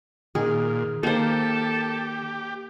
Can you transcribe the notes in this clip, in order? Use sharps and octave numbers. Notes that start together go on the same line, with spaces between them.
A#2 D#3 G#4
D#3 A#3 G4 A4 C5